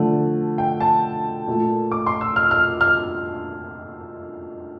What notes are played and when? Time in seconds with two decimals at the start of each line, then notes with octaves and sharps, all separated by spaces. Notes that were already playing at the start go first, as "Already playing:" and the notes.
Already playing: D3 F3 A3
0.58 G5
0.80 A5
1.47 A#2 A3
1.92 D6
2.06 C6
2.21 E6
2.36 F6
2.51 F6
2.81 F6